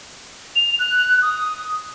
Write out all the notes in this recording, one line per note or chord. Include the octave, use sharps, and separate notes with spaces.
F7
F#6
D#6